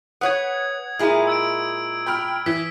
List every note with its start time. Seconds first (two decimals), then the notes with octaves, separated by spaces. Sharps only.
0.21 B4 C#5 F#5 D#6 G#6
0.99 A#2 G#3 E4
1.27 E6 G#6 D7
2.06 G5 B5 F6
2.46 E3 B6